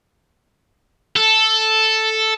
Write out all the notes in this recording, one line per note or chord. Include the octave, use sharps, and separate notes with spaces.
A4